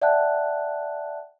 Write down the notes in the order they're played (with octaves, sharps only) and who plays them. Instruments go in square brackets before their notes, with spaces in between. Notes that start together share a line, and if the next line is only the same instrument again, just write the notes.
[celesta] D5 E5 F#5 G5 A5 F#6